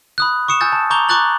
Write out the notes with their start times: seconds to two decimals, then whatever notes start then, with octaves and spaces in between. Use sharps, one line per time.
0.18 B5 D#6 F#6
0.48 C#6 D#6 C#7 E7
0.61 G#5 E6 G6 A6
0.72 A5
0.90 A#5 C#6 D6 G6 F7 G7
1.09 A#5 C#6 D6 F#6 A6 F#7